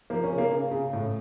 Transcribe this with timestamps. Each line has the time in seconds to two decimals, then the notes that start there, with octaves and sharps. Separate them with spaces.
0.10 F3 A#3
0.24 C#4
0.30 C#3
0.38 A#3
0.52 C#3
0.71 C#3
0.93 A2